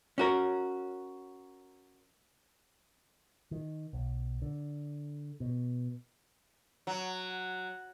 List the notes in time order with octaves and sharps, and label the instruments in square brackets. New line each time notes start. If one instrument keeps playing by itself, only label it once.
[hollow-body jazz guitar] C#4 F#4 A#4
[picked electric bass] D#3
B1
D3
B2
[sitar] F#3